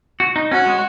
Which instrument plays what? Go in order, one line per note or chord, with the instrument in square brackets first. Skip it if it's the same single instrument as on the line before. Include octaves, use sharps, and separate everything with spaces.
[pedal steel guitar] F#4
D#4
[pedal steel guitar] C#4 [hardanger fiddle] F#4
[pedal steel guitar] G#3